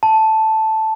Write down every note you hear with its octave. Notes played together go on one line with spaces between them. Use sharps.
A5